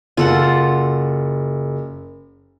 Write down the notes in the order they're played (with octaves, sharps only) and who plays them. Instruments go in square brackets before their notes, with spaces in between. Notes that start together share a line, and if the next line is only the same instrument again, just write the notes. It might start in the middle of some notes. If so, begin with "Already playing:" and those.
[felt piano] F#1 [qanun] F4 A4 F#5